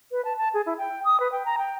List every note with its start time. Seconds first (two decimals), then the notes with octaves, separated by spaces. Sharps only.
0.12 B4
0.25 A5
0.38 A5
0.54 G#4
0.66 E4
0.78 G5
1.05 D#6
1.20 B4
1.32 G5
1.46 A#5
1.58 G5